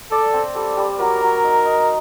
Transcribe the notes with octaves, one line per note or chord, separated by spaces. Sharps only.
A4 D5
C4
G3 A4
G3
F#3 A#4
F#3
D#4
D#4